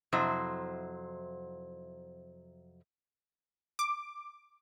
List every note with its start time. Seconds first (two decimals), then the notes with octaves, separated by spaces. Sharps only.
0.13 F2 C3 F#3 E4 C5
3.79 D6